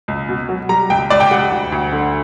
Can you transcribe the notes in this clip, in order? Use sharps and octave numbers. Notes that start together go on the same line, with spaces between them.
C#2
B2
F#3
G3 A#5
C#2 G5
C#2 D5
G5
G3 F#5
D2
D2
D3